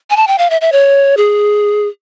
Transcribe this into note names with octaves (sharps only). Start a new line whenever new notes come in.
G#5
A5
G5
F5
E5
E5
C#5
G#4